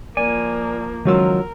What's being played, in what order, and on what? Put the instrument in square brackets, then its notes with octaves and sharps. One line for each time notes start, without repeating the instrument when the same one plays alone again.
[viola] F3 A#3 [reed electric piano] D5 [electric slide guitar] G#5
[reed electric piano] C#2 F#3 E6 [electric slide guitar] D#3 F3 F4 [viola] A#4